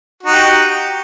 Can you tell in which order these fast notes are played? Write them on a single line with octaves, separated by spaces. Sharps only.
F#4 D#4 G4